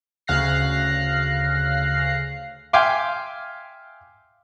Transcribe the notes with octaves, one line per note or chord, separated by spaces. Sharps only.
D2 C#3 F5 F#6 A#6 C7
E5 F5 G5 G#5 C6 D6